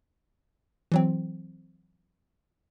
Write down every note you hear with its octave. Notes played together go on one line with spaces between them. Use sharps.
E3 F#3 C4